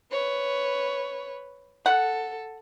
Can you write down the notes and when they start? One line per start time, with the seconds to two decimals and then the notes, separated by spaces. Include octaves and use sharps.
0.12 B4 C#5
1.86 A4 F#5